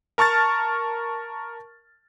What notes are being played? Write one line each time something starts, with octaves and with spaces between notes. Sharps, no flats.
A#4 A5 C#6 F6 A6